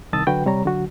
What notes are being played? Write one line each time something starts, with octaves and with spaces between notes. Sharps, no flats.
C2 D#3 A5 D#6 E6 A6
D3 F#3 F#4 B4 G5
C3 G3 C#5 A#5
D3 F#3 F#4